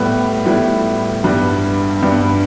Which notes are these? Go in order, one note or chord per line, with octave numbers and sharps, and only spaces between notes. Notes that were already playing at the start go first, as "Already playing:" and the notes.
Already playing: A2 G3 B3 G4
A2 G3 B3 E4
G2 G3 B3
G2 G3 B3